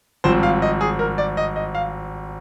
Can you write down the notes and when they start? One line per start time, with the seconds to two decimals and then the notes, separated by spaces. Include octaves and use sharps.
0.24 G#1 G2 F3 C4 C5
0.43 F5
0.62 D#5
0.81 G#4
0.99 A#4
1.18 D5
1.37 D#5
1.56 D#5
1.75 F5